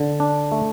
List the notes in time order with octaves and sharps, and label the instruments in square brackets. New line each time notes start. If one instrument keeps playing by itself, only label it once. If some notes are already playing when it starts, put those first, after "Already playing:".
Already playing: [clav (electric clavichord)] D3
D4
A3